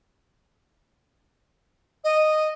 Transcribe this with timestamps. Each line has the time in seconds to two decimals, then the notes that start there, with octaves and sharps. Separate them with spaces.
2.04 D#5